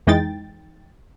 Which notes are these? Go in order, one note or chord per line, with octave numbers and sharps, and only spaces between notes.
F2 E3 G#3 D#4 G5 A6